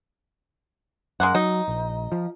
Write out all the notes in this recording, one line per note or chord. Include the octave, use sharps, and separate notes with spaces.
F#2 G#3 A#3 F#5
F#3 D#4
A#1
F3